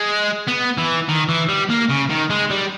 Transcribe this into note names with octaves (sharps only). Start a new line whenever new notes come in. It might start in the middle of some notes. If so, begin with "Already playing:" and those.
Already playing: G#3
B3
E3
D#3
E3
G3
A#3
C#3
D#3
G#3
G3